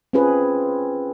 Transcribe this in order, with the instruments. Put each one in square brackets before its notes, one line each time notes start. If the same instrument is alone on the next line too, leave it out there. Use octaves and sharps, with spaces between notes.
[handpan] C4 C#4 F4 G#4 B4